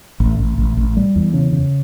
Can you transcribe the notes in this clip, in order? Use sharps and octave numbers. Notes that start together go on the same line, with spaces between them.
A1
A1
A1
A1
G3
E2
C#3
C#3